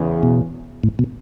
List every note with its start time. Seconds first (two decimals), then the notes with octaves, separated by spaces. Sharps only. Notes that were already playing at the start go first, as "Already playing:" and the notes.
Already playing: E2 C#3 E3
0.23 B2
0.84 A2
0.99 B2